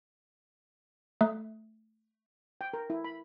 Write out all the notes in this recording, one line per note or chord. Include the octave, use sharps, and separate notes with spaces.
A3
G5
A#4
E4
B5